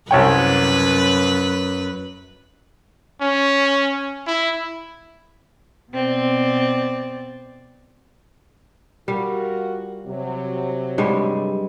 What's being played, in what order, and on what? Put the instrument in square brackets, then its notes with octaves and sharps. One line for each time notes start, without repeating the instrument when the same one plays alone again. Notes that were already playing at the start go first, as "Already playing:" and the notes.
[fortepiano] C2 C#5 G5 [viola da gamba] F#2 B4
[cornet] C#4
E4
[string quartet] B2 C4 D5
[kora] G3 [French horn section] F4 F#4 A#4
[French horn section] C3 F#3
[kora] G2 G3 G#3